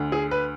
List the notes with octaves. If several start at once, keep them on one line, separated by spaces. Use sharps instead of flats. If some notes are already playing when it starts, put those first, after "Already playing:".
Already playing: D2 D3
G#4
B4